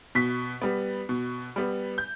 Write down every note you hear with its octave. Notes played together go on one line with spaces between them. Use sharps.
B2 B6
G3 B3
B2
G3 B3
G6